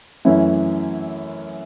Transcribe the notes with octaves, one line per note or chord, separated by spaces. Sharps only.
F#2 E3 A3 C#4 E4